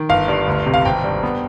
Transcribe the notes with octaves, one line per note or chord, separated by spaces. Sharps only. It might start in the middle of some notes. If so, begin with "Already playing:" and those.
Already playing: D#3
G1 F5
G2
D2
C3
F5
G#1 G5
G2
B3